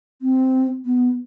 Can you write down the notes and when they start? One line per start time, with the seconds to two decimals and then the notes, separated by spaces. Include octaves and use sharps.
0.22 C4
0.86 B3